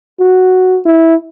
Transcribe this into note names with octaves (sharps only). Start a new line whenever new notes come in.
F#4
E4